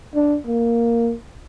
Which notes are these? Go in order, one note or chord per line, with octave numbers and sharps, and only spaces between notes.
D4
A#3